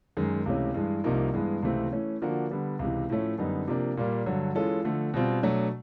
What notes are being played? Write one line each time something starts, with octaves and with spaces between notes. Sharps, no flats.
F#2 D#3 G#3
C#2 C3 E3 A3 C#4
G2 E3 G#3
C2 C3 F3 A#3 D#4
G2 E3 G#3 B3
C#2 C3 E3 A3 C4
E3 A3 C#4
D3 F3 A#3 D4 F#4
D3 G3 B3
C#2 C3 E3
A2 F3 A3 C#4
F#2 D3 G3 B3 D#4
C3 F3 A#3 D4
A#2 G3 A#3
G2 D3 F#3
E3 G#3 C#4 F4 A4
D3 F3 A3
B2 G3 C4 F4
B2 F#3 A3 D4